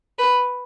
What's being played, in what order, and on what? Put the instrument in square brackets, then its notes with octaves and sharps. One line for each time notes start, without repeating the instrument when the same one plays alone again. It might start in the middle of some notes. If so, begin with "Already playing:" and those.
[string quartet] B4